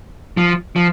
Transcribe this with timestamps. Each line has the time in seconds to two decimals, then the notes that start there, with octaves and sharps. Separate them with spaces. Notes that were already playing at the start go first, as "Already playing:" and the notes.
0.37 F3
0.76 F3